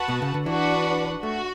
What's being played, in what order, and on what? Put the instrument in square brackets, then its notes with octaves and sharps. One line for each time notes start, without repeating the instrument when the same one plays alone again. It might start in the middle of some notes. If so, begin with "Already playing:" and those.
Already playing: [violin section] F#4 B4 F#5 A5
[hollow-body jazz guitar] B2
C#3
D3
[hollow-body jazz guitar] E3 [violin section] D4 F#4 B4 F#5
[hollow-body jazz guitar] A3 [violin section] F#4